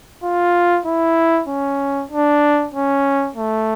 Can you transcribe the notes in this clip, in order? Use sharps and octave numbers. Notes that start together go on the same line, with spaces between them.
F4
E4
C#4
D4
C#4
A3